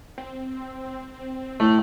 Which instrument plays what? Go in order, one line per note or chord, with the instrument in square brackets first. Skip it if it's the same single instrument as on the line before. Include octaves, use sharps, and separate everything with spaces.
[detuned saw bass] C4
[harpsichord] A2 [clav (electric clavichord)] A3